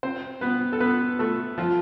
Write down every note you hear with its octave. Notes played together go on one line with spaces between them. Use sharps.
C4 C5
B3 B4
A4
B3 B4
A3 A4
F3 F4